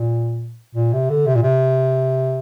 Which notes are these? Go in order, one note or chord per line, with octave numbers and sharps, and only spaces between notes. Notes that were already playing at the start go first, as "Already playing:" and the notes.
Already playing: A#2
A#2
C3
D3
C3
A#2
C3